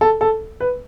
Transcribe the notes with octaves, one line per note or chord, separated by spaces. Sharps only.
A4
A4
B4